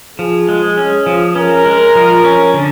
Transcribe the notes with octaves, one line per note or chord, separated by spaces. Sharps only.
F3 G#4
G#3
C#4
F3
C#4 A#4
G#3
F3
C#4
D3